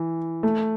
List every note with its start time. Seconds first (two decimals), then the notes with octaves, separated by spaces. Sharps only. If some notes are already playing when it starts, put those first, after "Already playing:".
Already playing: E3
0.43 A3